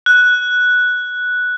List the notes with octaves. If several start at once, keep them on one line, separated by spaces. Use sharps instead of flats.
F#6